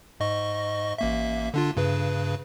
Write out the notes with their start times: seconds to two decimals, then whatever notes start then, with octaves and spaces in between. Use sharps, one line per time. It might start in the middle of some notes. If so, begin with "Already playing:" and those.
0.20 G#2 D#5 C#6
0.98 A1 A#3 E5
1.54 D3 D4 F4
1.77 G2 C#3 B4